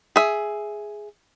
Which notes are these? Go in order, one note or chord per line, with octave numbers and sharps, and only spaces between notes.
G#4 E5